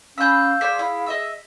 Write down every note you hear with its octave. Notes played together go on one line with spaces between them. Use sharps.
C#4 G#4 F5 B5 E6 G6
G#4 C5 D5 G#5 B6
E4
D#5 E5 E6